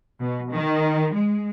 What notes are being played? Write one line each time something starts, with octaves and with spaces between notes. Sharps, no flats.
B2
D#3
G#3